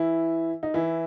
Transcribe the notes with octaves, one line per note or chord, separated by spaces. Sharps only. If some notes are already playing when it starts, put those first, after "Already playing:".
Already playing: E3 E4
D#4
E3 E4